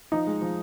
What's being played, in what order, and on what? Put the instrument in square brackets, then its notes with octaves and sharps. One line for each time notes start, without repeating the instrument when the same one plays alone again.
[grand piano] F3 D#4
G#3
F3